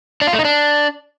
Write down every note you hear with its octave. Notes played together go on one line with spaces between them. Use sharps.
D4
F4
A3
D#4
D4